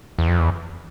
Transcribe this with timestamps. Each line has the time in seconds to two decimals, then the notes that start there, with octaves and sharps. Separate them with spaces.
0.19 E2
0.28 F2
0.39 E2